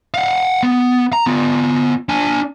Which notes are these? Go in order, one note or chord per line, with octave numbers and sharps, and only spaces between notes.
F5 F#5
B3
A#5
B3 F4
D4 G#5